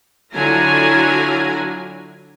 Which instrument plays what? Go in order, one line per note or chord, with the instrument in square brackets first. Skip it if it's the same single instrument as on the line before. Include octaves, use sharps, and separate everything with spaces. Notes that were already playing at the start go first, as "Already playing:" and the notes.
[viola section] D3 F#3 E4 F4 G#5 A#5